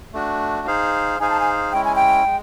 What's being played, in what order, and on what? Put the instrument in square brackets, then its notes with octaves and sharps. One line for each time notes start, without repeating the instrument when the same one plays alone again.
[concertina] A3 D4 F#4
D#4 G#4 C5 F5
[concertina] D#4 G#4 C5 F5 [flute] G#5
[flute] A5
G#5
[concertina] G#3 C#4 E4 [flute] G5
[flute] G#5
G5
[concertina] G#3